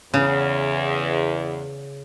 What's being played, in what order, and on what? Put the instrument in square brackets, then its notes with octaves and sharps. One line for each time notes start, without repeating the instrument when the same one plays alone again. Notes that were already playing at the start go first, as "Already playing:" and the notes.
[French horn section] E2 [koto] C#3